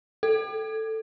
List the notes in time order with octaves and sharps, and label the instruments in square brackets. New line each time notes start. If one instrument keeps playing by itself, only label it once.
[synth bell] A4